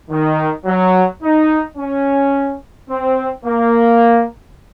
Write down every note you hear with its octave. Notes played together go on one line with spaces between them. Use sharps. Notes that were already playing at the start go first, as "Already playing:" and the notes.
D#3
F#3
D#4
C#4
C4
A#3